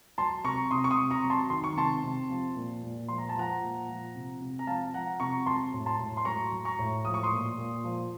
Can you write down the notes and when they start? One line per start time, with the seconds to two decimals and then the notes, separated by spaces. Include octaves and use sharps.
0.18 F#3 A5 C6
0.44 C3 A#5 C#6
0.71 C3 C6 D#6
0.84 C#6
0.90 C6 D#6
0.98 C3
1.11 A#5 C#6
1.24 F#3
1.30 A5 C6
1.50 D#3 C6
1.64 C#6
1.76 C3 A5 C6
2.04 C3
2.29 F3
2.56 A#2
2.83 A#2
3.08 F3 C6
3.18 A#5
3.29 A5
3.36 F3 F#5 A#5
3.62 A#2
3.88 F3
4.15 C3
4.41 C3
4.59 A#5
4.67 F3 F5 A5
4.94 F3 F#5 A#5
5.20 C3 A#5 C#6
5.46 F#3 A5 C6
5.73 A2
5.86 A5 C6
5.99 A2
6.17 C6
6.25 F#3 A#5 C#6
6.52 F#3
6.65 A#5 C#6
6.79 A2
7.05 F3 D#6
7.14 C#6
7.23 C6 D#6
7.32 A#2
7.58 A#2
7.84 F3